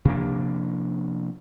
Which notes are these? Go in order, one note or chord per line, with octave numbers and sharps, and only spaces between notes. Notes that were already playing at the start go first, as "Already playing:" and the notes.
C3 F3 A#3 D4